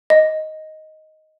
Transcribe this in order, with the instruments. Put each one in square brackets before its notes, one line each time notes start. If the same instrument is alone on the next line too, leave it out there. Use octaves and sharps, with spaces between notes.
[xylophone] D#5